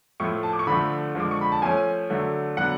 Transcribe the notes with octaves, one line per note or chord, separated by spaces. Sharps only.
A2 F3 A3 C#6
A5
D6
C#6
D3 F3 A3 B5
D3 F3 G#3 D6
C#6
B5
A5
F3 A3 C#4 G#5
D3 F#3 A3
D3 F#3 B3 F#5